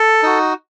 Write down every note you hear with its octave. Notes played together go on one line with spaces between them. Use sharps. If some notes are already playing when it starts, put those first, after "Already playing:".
Already playing: A4
D#4 F#4